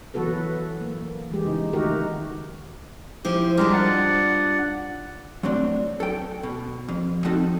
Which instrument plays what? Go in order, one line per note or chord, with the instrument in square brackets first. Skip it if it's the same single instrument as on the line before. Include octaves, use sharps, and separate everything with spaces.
[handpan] E3 F#3 B3 F#4 A4 B4
B4
A#3
E3 G#3 G4
C#3 D#4
D#3 A3 D#4 F#4 G4 A#4
[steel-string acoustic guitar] F3 E4 C5 [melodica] G4
[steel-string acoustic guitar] G3 D4 F4 [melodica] G#3 G4 A#4
[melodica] D5 F#5
[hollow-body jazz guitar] F#3 A3 C4 D4
A4 G5
B2
F2
F3 C4 D#4 F#4 A4